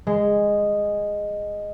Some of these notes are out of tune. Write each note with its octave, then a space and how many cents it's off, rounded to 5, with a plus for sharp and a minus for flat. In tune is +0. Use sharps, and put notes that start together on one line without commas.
G#3 -10